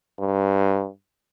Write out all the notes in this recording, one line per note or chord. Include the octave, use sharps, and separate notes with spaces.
G2